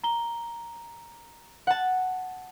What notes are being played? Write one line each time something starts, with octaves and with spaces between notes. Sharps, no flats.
A#5 G7
F#5 A5